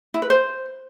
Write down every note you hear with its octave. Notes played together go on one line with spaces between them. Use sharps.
E4
B4
C5